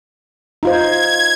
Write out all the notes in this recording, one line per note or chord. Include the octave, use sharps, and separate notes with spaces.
D#4 F4 C5 G#6